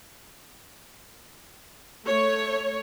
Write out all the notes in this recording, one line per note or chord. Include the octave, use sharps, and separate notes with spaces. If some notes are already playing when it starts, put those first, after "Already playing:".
A3 C#5